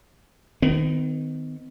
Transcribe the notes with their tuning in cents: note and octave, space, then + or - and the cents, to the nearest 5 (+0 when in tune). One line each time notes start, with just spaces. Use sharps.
D#3 +0 B3 +45